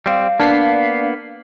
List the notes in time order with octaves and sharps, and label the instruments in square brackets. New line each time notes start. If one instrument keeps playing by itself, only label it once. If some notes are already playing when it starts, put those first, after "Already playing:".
[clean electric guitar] G3 C4 [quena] F5
[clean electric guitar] A#3 B3 [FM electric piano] D4 B6 C7